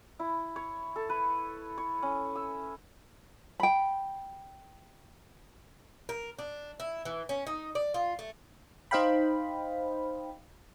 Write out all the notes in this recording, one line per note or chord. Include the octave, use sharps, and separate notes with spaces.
E4
C#5
A4
B4
C#5
C#4
E6
G5 B5
A#4
D4
E4
E3
C#4
D#4
D5
F4
A3
D#4 C5 D#5 F5 G5 B5